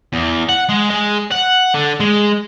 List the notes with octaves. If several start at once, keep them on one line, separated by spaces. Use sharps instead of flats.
E2
F#5
G#3
G#3
F#5
D3
G#3